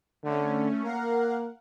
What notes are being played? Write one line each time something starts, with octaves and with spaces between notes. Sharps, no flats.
D3 A3 C#4
A#3 A#4 F5 F#5